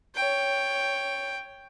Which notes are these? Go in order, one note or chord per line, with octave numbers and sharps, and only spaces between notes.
C#5 G5